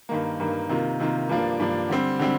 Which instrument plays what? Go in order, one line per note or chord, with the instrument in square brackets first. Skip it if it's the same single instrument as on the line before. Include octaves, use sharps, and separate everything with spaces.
[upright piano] G2 D#3 A#3
G2 D#3 A#3
C3 D#3 A#3 F4
C3 D#3 A#3 F4
G2 F3 A#3 D4
G2 F3 A#3 D4
D3 G3 C4
D3 G3 C4